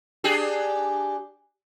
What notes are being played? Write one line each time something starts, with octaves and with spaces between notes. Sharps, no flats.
D4 G4 G#4